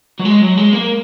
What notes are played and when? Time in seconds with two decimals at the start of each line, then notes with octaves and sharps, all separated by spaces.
0.20 F#3
0.25 G#3
0.41 F#3
0.57 G#3
0.73 A#3